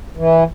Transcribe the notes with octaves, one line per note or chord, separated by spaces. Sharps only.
E3